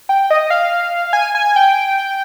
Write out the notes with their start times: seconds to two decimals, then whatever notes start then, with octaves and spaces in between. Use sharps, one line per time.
0.09 G5
0.30 D#5
0.50 F5
1.13 G#5
1.35 G#5
1.56 G5